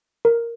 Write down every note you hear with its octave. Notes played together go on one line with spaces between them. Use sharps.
A#4